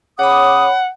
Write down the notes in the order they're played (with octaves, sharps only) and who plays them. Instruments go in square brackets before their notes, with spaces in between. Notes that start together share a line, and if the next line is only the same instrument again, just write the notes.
[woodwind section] C#3 D6 D#6 [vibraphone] C#5 B5 [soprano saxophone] F#5